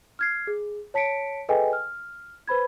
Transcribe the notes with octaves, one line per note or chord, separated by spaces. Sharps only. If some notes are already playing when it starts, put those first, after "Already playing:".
F6 G#6 C7
G#4
C#5 A5 B6 C#7 D7
G#4 A4 B4 D#5 G5 G#5
F6
B4 C5 B5 G#6